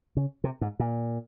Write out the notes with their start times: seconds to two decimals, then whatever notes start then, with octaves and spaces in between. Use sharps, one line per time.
0.17 C#3
0.44 C3
0.61 G#2
0.80 A#2